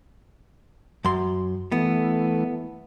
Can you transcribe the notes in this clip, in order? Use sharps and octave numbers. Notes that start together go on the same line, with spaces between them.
F#2 C6
E3 A3 B3